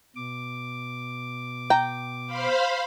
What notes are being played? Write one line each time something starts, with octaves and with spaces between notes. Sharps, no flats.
B2 D6
G5 A#5
C5 F5 B5